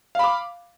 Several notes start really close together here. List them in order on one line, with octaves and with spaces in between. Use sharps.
F5 B5 D6